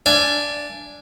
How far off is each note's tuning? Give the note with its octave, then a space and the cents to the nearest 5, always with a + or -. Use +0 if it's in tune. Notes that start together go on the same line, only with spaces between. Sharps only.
D4 -5 E5 +45 G#5 +10